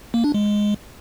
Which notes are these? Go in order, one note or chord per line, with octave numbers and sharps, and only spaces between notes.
A#3
D4
G#3